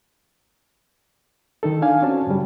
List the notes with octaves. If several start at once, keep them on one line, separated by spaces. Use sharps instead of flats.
D#3 D#4 A4
D4 F5 G#5
C4 C#4 F#4 A5
G2 C#3 G3